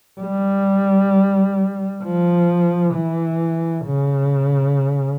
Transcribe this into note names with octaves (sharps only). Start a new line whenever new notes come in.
G3
F3
E3
C#3